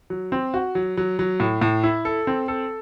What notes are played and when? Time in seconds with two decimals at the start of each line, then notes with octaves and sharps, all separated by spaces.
0.10 F#3
0.32 C4
0.54 F#4
0.75 F#3
0.97 F#3
1.19 F#3
1.40 A2
1.61 A2
1.84 E4
2.05 A4
2.27 C4
2.48 A4